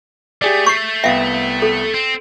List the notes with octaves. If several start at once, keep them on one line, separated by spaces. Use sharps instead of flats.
A3 G4 G#4 D5
C#6 G6 C7
C2 B3 E5 F5 G5
A4
C4